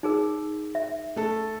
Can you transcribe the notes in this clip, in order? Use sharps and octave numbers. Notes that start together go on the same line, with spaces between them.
D#4 G#4 A#4
E5
A3 A4